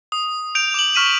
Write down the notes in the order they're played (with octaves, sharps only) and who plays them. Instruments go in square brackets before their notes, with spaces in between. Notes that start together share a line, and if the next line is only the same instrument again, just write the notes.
[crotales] D#6
G6 D7 F7
D6 F#7
C#6 F6 B6 D#7 E7 F#7